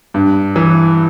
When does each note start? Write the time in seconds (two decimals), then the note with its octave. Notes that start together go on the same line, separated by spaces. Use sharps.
0.14 G2
0.56 E3